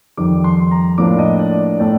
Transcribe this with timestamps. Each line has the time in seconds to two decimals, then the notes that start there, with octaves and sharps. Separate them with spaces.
0.17 F2 D#3 G3 D6
0.44 C6
0.71 A#5
0.98 A2 F3 A#3 D4 D6
1.19 D#5
1.39 D5
1.59 D5
1.80 A2 A3 D4 D5